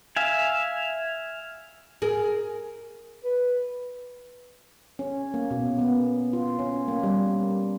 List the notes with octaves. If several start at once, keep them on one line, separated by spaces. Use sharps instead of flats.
E5 F5 G#5
G#4 A#4
B4
C#4
A#3
B2
B3
F4
C#4
A#3
G3